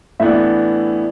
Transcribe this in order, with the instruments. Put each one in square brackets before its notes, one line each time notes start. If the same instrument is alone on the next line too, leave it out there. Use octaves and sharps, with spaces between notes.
[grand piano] A2 E3 B3 D4 [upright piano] E5